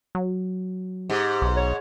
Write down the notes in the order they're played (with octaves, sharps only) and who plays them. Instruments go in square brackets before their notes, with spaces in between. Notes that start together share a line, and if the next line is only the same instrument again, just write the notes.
[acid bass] F#3
[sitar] G#2 [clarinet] G4
[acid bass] B1
[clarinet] C#5